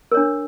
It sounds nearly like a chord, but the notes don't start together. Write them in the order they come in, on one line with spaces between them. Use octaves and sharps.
A#4 C#5 D4